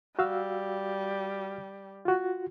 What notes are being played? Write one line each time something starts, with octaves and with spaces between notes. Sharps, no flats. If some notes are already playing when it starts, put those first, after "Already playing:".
G3 F#4 F5 E6
F4 F#4